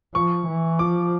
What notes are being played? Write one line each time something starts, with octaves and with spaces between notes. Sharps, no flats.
F3 C#6
E3
F3 D6